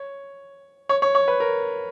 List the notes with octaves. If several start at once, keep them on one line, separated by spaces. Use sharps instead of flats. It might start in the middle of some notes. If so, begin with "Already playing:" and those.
Already playing: C#5
C#5
C#5
C#5
B4
A#4